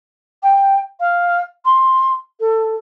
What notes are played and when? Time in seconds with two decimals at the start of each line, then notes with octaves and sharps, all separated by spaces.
0.43 G5
1.00 F5
1.65 C6
2.40 A4